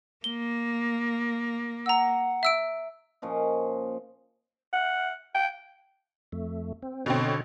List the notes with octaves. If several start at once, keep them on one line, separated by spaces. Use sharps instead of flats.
A#3 G7
F#5 A#5 E6
E5 E6 D7
A#2 F3 C#4 D#5
F#5
G5
F2 A3
C4
B2 D3 C4 C#5